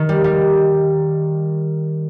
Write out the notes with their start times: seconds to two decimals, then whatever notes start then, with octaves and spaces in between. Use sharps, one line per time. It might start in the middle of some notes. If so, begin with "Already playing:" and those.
Already playing: D#3
0.09 G3
0.24 G3